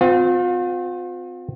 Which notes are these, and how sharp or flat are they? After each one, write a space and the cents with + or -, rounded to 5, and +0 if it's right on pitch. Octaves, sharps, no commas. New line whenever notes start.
C4 -30 F4 +40